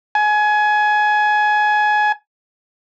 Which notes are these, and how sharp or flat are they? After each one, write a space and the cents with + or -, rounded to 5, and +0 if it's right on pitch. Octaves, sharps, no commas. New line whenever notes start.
G#5 +25